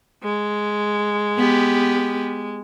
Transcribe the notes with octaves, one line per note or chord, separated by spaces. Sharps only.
G#3
B3 G4